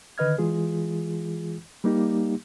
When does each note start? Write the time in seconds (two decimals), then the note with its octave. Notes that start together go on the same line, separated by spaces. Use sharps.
0.18 D3 D#3 B4 D#5 F6 G#6
0.38 E3 G#3 F4 G#4
1.84 G3 A#3 D#4 G4